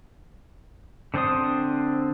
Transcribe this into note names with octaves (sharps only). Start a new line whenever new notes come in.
D3 C4 D4 C5 D#6